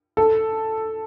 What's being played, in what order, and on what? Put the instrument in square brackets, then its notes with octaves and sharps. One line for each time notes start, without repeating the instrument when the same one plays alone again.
[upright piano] A4